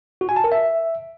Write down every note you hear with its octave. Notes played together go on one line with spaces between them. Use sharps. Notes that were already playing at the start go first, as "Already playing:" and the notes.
F#4
G#5
A5
A#4
E5